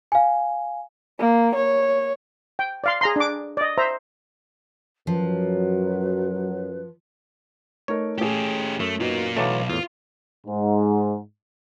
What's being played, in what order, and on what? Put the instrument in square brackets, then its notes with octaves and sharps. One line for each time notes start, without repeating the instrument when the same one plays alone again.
[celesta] F5 G#5
[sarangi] A#3
C#5
[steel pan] G5
D5 F5 C6
G#4 A#5 C6
D4 D6
D5 D#5
C5 E5 A#5
[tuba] F#2 [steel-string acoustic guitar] F3 [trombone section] F#3 [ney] B4
[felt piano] A3 D#4 A#4 [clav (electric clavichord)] C#5
[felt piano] A3 G#4 [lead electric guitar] C#4 G4
[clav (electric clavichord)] F#2 [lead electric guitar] A3
[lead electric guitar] A#3 F4 [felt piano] B3 D#4 F#4
[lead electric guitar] B1 [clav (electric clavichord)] E3 F#3 A3 [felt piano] F5 D6 A6
[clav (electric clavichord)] E2 A2 [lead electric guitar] F4
[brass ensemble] G#2